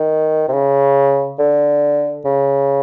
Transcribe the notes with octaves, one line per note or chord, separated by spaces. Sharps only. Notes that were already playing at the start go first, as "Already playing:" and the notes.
Already playing: D#3
C3
C#3
D3
C#3